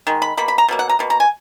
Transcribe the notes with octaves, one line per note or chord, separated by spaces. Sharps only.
D#3 G#3
B5
B2 A#3 B5
B5
A#5
B2 F#3 A#3
F#5
A#5
B2 A#3
A#5
G#5